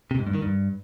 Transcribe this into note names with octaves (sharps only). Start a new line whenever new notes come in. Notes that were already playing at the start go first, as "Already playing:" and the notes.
C3
G#2
G2
D#3
G2